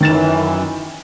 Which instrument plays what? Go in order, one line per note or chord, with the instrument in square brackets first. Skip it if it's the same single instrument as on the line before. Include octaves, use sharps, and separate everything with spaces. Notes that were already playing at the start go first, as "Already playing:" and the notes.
[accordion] F#2 E3 [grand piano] D#3 A6 E7